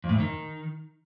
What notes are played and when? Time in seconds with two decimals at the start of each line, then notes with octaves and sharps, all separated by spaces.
0.04 F2
0.09 A2
0.15 F2
0.20 D#3